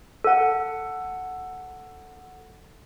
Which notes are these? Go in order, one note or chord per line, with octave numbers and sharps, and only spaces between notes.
A4 F#5